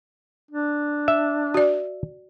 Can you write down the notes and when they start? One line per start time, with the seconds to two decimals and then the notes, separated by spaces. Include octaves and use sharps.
0.51 D4
1.08 E5
1.54 F#4 D5